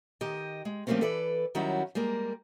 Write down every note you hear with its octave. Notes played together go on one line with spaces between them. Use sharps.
D#3 G4 D#5
G#3
F3 G3 A3 A#3 C4 C#4
E3 A4 B4 D5
D#3 F#3 G3 C#4 E4 F#4
G3 G#3 A#3 A#4